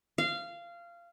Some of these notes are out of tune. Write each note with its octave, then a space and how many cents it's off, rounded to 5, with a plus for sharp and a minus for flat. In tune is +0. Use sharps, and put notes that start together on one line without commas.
F5 -20